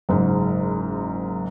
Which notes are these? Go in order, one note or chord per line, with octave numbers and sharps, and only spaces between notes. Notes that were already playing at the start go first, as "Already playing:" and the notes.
F#1 G#2